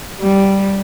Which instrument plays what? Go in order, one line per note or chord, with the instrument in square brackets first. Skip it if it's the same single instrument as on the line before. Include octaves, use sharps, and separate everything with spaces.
[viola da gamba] G3